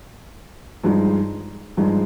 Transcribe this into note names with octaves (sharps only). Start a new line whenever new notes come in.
G2 F3 G#3 D#4
G2 F3 G#3 D#4